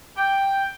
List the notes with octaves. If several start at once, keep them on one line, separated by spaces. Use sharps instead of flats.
G5